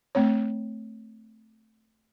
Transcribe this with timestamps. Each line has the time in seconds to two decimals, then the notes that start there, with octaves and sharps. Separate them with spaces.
0.15 A3 C4 C#5